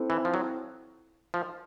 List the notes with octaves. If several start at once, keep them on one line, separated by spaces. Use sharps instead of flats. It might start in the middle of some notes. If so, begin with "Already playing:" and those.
Already playing: C4 E4 A4 C5
E3
F3
F#3
F3